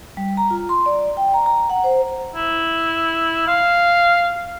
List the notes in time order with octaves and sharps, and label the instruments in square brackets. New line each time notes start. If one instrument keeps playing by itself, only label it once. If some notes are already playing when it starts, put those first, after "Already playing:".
[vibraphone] G3
A#5
F4
C6
D5
G5
A#5
A#5
F#5
C5
[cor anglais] E4
F5